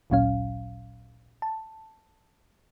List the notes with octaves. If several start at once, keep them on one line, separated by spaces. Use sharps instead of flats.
A1 D2 A#2 F#3 C#4 F5
A5